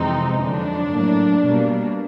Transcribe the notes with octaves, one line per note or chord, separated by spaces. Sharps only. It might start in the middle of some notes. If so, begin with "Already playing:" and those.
Already playing: F2 C3 E3 G#3 C4 D#4
F2 D3 F#3 D4
A2 F#3 A#3
B2 G3 A#3